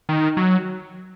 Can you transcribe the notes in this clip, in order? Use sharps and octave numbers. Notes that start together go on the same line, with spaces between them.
D#3
F#3